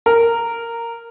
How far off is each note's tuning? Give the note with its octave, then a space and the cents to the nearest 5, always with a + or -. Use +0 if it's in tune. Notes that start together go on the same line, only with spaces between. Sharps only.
A#4 -10